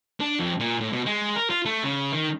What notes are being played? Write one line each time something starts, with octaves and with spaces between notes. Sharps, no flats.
D4
F2
A#2
A2
B2
G#3
A#4
F4
A3
C#3
D#3